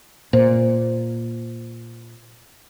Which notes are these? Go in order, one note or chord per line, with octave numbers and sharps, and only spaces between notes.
A#2 C5